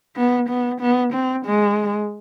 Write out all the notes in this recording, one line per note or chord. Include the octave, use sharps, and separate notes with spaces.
B3
B3
B3
C4
G#3